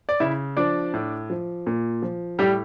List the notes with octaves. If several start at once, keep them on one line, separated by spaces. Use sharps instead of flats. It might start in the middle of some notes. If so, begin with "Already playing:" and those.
D5
C#3 E4 E5
F3 D4 D5
A2
F3
A#2
F3
A2 G3 G4